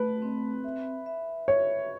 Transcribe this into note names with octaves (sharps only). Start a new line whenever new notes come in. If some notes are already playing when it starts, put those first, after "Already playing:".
Already playing: A3 B4
C4
E5
E5
C#5 E5